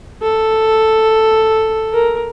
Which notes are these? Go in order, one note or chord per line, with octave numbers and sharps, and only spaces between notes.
A4
A#4